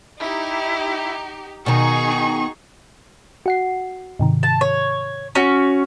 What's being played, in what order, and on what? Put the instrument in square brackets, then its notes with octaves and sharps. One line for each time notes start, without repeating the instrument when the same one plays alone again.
[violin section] D#4 G4 [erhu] E4
[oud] B2 D#3 [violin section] D#4 F#4 G#4 [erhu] C#6
[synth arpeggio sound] F#4 F#5 C7
G#2 C3 D#3
[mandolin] A5
C#5
C#4 F#4